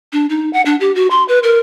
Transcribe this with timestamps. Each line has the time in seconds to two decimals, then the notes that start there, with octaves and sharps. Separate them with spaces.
0.13 D4
0.29 D#4
0.53 F#5
0.66 D4
0.80 G4
0.95 F#4
1.10 C6
1.28 B4
1.43 A#4